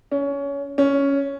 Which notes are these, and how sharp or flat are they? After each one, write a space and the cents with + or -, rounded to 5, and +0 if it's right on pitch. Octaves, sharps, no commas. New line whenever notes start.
C#4 +20
C#4 +5